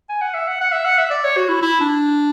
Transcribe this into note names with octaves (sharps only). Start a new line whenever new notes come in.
G#5
F#5
E5
F#5
F#5
E5
F#5
E5
D5
C#5
F#4
E4
E4
D4